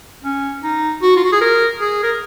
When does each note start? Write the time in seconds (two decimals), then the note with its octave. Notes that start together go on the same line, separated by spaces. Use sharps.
0.24 C#4
0.63 D#4
1.02 F#4
1.16 F4
1.24 F#4
1.32 G#4
1.41 A#4
1.80 G#4
2.03 A#4